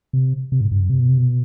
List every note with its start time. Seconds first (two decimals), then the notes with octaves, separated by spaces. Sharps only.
0.13 C3
0.52 C3
0.61 G#2
0.71 G2
0.80 F#2
0.90 C3
0.99 B2
1.09 C3
1.18 B2